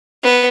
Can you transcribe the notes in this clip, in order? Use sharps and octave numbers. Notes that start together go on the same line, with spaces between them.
B3